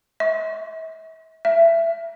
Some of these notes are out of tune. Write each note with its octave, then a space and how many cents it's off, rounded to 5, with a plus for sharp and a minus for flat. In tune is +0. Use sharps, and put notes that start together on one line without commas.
E5 -40
E5 +20